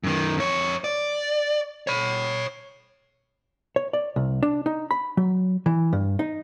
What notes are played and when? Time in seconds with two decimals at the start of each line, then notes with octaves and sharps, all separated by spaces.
0.04 F#2 D#3
0.37 F2 C#5
0.84 D5
1.87 C#5 B5
3.76 C#5
3.93 D5
4.16 C2
4.43 D4
4.66 D#4
4.91 B5
5.17 F#3
5.66 E3
5.93 G2
6.19 D#4